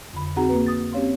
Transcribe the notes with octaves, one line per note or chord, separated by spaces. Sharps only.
F2 D3 B5
C4 D#4 F#4 G#4 F#5 A#5
A#3 B4
D#6 A6
C4 C#4 G4 C#5 F5 C6